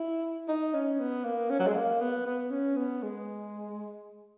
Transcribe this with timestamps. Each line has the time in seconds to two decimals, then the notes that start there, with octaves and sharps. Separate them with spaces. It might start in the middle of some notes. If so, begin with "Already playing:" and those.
Already playing: E4
0.48 D#4
0.74 C#4
0.99 B3
1.25 A#3
1.50 C#4
1.59 F#3
1.67 G#3
1.75 A#3
2.01 B3
2.26 B3
2.51 C#4
2.76 B3
3.02 G#3